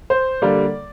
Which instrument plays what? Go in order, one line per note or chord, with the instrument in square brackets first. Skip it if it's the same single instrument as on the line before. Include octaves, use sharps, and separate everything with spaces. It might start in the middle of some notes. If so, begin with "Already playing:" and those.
[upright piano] C5
D3 G3 A#3 D5